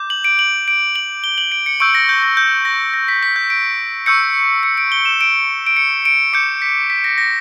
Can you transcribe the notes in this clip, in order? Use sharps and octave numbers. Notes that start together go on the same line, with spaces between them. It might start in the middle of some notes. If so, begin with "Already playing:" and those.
Already playing: D6 G6
F#7
D7
F#7
D7
F#7
G7
F#7
D7
C#7
C#6 E6 G6 D7
A#6
G6
A#6
G6
A#6
A#6
B6
B6
G6
D7
C#6 E6 G6 C#7
C#7
D7
G7
E7
D7
D7
C#7
D7
D6 G6 C#7
B6
B6
A#6
A#6